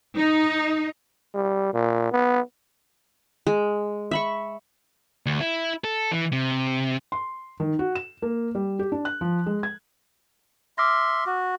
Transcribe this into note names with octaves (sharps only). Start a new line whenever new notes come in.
D#4
G3
A#2
B3
G#3
E5 B5 C#6
D2
E4
A4
E3
C3
C6
D#3
F#4
E7
A#3
G3
G4
D4
F#6
F3
G#3
G#6
E5 C6 D6 F6 A#6
F#4